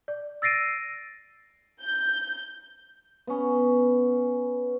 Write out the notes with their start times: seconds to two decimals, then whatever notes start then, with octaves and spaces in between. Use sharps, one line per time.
0.08 D5
0.42 E6 A6 A#6 C7 D7 D#7
1.84 G6
3.27 B3 C#4